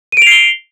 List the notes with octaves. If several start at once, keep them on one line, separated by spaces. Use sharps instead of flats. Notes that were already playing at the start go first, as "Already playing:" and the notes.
C7 D7 D#7 F7 G7